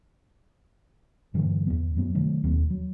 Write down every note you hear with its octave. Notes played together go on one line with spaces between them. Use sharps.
G2 D3 E3 F#3
E2 B3
F#2 F#3 B3
C3 D#3 F#3 A3
E1 D#2 C4
F#3